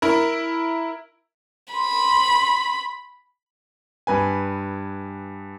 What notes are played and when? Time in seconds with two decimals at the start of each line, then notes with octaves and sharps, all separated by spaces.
0.02 E4 A#4
1.74 B5 C6
4.07 G2 B4 G#5